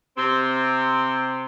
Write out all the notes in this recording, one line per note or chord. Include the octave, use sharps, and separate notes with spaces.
C3 C4